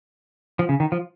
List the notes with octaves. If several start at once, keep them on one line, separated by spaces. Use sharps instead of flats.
F3
C#3
D#3
F3